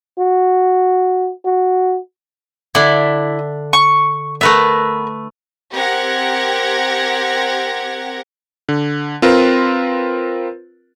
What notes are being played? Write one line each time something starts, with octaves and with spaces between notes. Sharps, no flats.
F#4
F#4
D3 D4 E4
C#6
A3 B3 A#4 B4 E5
C4 G4 A#4 F#5 G#6 A#6
D3
C4 F4 A#4 B4